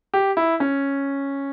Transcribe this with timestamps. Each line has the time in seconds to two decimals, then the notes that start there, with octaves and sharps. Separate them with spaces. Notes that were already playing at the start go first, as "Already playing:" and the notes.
0.14 G4
0.37 E4
0.60 C#4